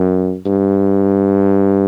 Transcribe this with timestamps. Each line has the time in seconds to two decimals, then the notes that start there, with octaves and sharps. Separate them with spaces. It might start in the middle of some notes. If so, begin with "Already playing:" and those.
Already playing: F#2
0.46 G2